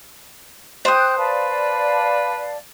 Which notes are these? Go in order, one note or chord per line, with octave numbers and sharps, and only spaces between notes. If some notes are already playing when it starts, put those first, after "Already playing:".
C5 G5 D#6 F#6 G6
B4 D5 F5 A5